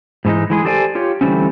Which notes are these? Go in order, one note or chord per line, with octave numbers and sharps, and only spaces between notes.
G#2 D3 E3 G#3 D#4
E3 G#3 G#4
G4 A4 C5 D5 G5 G#5
F4 G4 C#5
D3 E3 G3 A3 C4 C#4